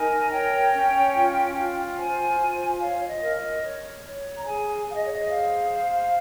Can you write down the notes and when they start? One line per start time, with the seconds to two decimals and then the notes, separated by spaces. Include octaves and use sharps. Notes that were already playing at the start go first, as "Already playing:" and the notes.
Already playing: D#4 A#4 G#5
0.30 C#5 G5
0.72 C#4
1.14 F4
1.56 F4
1.96 C5 G#5
2.39 F4
2.79 C#5 F5
2.97 C#5
3.07 D#5
3.21 A#4
3.35 D#5
3.63 C#5
4.04 C#5
4.38 A#5
4.46 G#4 G#5
4.87 G#4 F5
4.95 D#5
5.05 C#5
5.13 D#5
5.28 C5 F5
5.70 C5